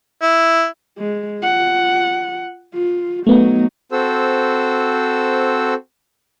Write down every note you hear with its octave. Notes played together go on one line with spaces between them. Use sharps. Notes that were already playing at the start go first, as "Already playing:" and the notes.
E4
G#3
F4 F#5
F4
F#3 A3 B3 D#4
C4 F#4 A4 C5 E6